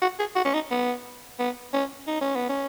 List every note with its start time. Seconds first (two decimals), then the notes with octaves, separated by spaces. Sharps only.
0.02 F#4
0.19 G#4
0.36 F#4
0.45 C#4
0.54 D#4
0.71 B3
1.39 B3
1.74 C#4
2.07 D#4
2.21 C#4
2.36 B3
2.49 C#4